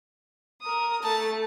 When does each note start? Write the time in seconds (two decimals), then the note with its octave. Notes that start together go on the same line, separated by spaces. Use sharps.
0.63 A#4 D#6
1.03 A3 A5